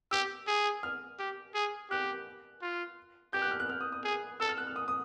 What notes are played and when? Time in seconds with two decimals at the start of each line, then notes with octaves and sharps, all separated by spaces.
0.11 G4 E6
0.47 G#4
0.83 F6
1.19 G4
1.54 G#4
1.90 G4 F#6
2.62 F4
3.33 G4 G6
3.42 F#6
3.51 F6
3.60 F#6
3.70 F6
3.81 D#6
3.92 D#6
4.04 G#4
4.40 A4 E6
4.49 F6
4.58 F#6
4.67 F6
4.76 D#6
4.88 D#6